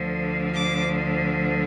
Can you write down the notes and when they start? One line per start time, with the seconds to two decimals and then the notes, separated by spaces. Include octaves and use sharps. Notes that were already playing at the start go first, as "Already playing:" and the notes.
Already playing: D2 D3 F3
0.54 D6